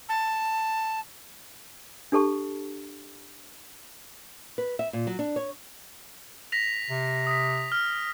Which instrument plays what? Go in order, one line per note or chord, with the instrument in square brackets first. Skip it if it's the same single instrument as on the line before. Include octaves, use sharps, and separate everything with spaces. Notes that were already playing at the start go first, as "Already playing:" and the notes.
[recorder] A5
[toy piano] D4 G4 A4 A5 C#6
[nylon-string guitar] B4
E5
A#2
F#3
D4
C#5
[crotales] A#6 B6 F7
[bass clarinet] C3
[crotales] D#6 B6
F6